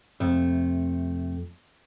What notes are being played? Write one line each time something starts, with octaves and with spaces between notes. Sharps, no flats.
F2 C3 A3